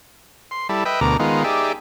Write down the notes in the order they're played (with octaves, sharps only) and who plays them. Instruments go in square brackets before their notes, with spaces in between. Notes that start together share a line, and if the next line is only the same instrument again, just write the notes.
[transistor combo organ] C6
G3 E4 A4
B4 D#5 E5 G5
D2 B2 A#4 A#5 D6
D#3 G#3 B3 D#4 F4
D#4 G4 G#4 D5 E5